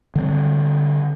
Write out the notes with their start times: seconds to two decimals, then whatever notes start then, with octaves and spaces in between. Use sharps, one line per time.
0.15 D3 G3 C4